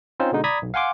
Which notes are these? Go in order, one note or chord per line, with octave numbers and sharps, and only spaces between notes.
C4 C#4 D#4 F4 C5
B2 D3 G#3 D#4
D5 A#5 B5 D#6 G#6 B6
B1
F5 F#5 G#5 C6 D6